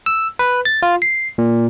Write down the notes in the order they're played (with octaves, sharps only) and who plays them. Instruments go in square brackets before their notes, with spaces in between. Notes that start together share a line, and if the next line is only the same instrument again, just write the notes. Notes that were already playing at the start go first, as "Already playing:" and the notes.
[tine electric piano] E6
B4
A6
F4
C7
A#2